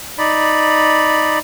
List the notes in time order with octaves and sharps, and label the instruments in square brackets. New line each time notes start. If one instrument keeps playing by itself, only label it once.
[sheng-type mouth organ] D#4 D5 B5